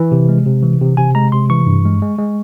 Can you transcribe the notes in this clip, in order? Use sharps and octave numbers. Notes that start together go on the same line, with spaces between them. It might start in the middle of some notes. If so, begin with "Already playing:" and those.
Already playing: E3
C3
G#3
C3
E3
C3
C3 G#5
G#3 A#5
C3 C6
E3 C#6
G2
G#3
G#3
G#3